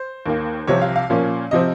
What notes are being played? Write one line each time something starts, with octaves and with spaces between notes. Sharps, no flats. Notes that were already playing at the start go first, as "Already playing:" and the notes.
Already playing: C5
D#2 D#3 A#3
C2 C3 F3 C4 C#5
F5
F5
A#2 F3 A#3 C#4
C3 F3 C4 D#5